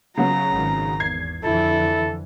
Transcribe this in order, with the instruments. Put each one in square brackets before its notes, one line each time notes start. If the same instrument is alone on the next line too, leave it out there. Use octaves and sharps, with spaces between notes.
[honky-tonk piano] C#3 F#3 B3 [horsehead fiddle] A#5
[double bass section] G#1 D#3
[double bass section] E2 [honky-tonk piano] G#6 C7
[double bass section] F2 D3 E3 [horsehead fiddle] E4 [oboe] A4